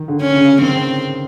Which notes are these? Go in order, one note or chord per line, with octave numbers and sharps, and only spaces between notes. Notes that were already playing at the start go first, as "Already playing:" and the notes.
Already playing: D#3
D3
C#4
C#3
D#3 C4